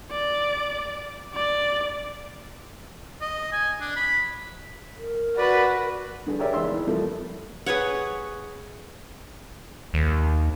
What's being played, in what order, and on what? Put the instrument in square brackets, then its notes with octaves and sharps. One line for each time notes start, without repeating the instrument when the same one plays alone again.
[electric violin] D5
D5
[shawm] D#5
G#5
D4
B5
[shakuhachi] A#4
[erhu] F#4 [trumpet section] B4 [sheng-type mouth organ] D5
[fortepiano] G2 D3 G#4
G4 G#4 A#4 C#5 D5 E5
E2 G#3 D#4 E5 C6 E6
E3
F2 C3 F3 G3 A3 A#3
[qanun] G#4 B4 C#5 F#5
[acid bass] D#2